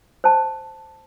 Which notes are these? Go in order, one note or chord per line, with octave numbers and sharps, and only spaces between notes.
C5 A5